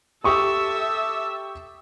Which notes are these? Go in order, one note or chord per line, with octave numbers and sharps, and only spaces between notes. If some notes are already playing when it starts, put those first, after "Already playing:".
G4 A4 E5 C#6 D#6